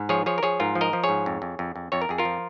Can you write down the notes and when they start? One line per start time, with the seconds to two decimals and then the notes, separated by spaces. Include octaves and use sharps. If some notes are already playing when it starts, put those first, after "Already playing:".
Already playing: G#2
0.09 F3 G#4 C#5
0.26 F3 G#4 C#5
0.38 A#4
0.43 F3 G#4 C#5
0.60 G#2 F4 A#4
0.75 F3
0.81 A#4 D#5
0.93 F3
1.04 G#4 C#5
1.09 G#2
1.26 F2
1.42 F2
1.59 F2
1.76 F2
1.92 F2 C#5
2.02 A#4
2.09 F2 G#4
2.18 F4 A#4
2.25 F3